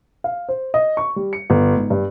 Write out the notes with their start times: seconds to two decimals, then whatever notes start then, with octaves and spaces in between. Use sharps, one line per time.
0.24 F5
0.49 C5
0.74 D#5
0.97 C#6
1.16 G3
1.33 C#7
1.50 G1
1.76 G#2
1.90 G2